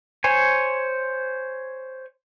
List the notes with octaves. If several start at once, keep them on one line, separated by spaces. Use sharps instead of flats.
C5 C#5 G#5